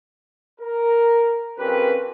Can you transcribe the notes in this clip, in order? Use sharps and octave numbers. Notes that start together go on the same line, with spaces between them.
A#4
F2 C4 C#4 G4 A#4 B4